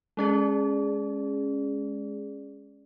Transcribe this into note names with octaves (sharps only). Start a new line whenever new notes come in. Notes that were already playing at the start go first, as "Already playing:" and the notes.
G#3 C#4 G#4 D5